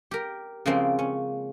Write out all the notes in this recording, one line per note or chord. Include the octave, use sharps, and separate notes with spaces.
G4 A#4
C#3 F3 G#3 A#3 C4
C#4